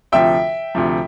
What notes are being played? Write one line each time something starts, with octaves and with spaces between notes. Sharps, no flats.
D2 C3 F3 E5 G5
D2 C3 F3